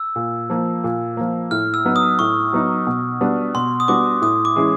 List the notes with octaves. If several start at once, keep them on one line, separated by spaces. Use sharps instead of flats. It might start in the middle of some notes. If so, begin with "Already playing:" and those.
Already playing: E6
A#2
F3 A#3
A#2
F3 A#3
A2 F6
E6
F#3 B3 D#4
D#6
A2 C#6
F#3 B3 D#4
B2
G3 B3 D4 F#4
B2 C6
D#6
G3 B3 D4 F#4 D6
A2 D#6
D6
E3 G#3 C#4 E4